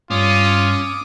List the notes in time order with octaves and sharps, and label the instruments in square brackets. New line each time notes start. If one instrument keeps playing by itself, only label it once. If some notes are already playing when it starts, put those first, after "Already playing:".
[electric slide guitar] G2 [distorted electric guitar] C#4 [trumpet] F4 [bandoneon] D6 D#6